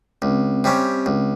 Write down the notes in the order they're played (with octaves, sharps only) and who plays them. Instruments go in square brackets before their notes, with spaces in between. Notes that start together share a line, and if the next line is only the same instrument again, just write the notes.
[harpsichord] C#2 [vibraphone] C4
[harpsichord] C3 G3 C#4
C#2